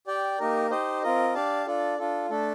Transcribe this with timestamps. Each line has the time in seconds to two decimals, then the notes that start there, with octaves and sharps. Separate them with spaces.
0.07 G4 D5 G5
0.39 A#3 D#4 G4 A#4
0.71 D#4 G4 C5 D#5
1.03 C4 F4 A#4 D#5
1.34 D4 G4 D5 F5 A5
1.67 D4 F4 A4 D5
1.98 D4 F4 A4
2.30 A3 D4 A4